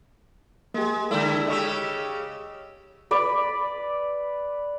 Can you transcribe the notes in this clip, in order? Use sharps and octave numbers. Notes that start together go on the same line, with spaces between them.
G#3 A#3 G4
D3 G#3 E4 A4 D5
C#3 G4 D#5 C#6 E6
B4 D5